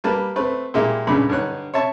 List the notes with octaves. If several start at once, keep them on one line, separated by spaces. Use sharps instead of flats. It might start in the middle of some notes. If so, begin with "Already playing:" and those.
G3 A#3 B4 A5
A3 C4 B4
A#2 G#3 A#3 E4 G4
C#2 G2 A#2 C#3 B5
G2 D3 D#4 C#5 F#6
C#5 E5 A5 C#6